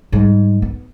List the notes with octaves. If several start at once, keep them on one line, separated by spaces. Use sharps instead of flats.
G#2 G3
B3